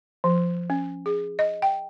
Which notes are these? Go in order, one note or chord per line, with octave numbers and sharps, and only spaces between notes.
F3
C#4
G#4
D#5
G5